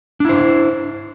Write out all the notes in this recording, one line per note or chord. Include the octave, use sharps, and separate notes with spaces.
D4 E4 C5